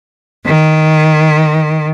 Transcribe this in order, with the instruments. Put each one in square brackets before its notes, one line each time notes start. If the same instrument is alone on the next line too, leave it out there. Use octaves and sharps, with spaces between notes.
[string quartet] D#3